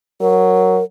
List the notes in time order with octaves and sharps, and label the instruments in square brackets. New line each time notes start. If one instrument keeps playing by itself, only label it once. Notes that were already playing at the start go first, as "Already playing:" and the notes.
[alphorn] F#3 [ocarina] A#4